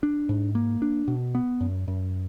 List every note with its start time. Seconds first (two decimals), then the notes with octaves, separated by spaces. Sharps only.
0.03 D4
0.29 G#2
0.55 A#3
0.82 D4
1.08 B2
1.35 B3
1.61 F#2
1.88 F#2